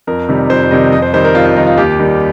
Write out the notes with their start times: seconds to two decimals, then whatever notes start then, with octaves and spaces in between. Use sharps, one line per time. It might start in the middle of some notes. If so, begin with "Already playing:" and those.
0.07 F2 A#4
0.29 C3 D#3 G3
0.50 F2 C5
0.71 C3 D#3 G3 D#5
0.92 F2 D#5
1.02 C5
1.14 D#3 G3 C5
1.25 A#4
1.35 F2 F4
1.45 F4
1.56 D#3 G3 D#4
1.67 F4
1.78 D#2 G4
1.99 D#3 G3